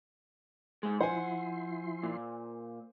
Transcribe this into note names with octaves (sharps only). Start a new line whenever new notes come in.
G#2 G#3
F3 E4 C5 F#5 G#5 C6
A#2